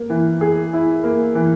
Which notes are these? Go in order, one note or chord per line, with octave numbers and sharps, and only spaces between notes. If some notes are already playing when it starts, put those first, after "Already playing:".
Already playing: A#3
E3
G#4
E4
A#3
E3